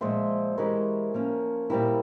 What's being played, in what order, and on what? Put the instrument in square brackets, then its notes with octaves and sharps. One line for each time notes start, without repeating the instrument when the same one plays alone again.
[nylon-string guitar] A#2 F3 G#3 C4 [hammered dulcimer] C5 E5
[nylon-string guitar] E3 G#3 E4 G4 [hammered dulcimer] A#4 C#5
[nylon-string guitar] F3 A#3 C#4
[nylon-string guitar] A#2 G3 C4 E4 [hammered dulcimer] G4 A#4